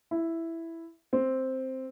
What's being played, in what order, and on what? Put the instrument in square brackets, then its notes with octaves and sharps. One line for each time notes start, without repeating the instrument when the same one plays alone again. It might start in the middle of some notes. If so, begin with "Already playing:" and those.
[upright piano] E4
C4